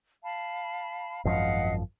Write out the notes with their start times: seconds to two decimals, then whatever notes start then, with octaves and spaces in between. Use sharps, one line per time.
0.23 F5 A5 B5
1.25 G#1 F#2 F3 D#5 F5 F#5